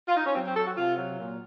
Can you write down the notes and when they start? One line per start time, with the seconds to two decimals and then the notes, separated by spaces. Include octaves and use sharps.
0.08 F4
0.17 D#4
0.26 C#4
0.35 F#3 C4
0.46 C4
0.56 F#3 A4
0.66 F#4
0.77 C3 F4
0.98 F#3
1.18 A#2